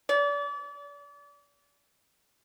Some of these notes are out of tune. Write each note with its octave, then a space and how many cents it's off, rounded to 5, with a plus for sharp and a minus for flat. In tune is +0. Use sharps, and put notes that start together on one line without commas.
D5 -35